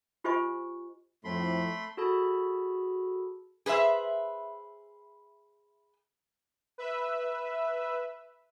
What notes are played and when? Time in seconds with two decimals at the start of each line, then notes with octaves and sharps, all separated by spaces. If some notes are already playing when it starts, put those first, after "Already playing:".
0.24 F4 G4 C5 D#5 G#5 C#6
1.24 F2 A2 A3 C4 B5 C6
1.97 F#4 G#4 A4 A5 B5
3.66 G#4 B4 C5 E5
6.78 B4 E5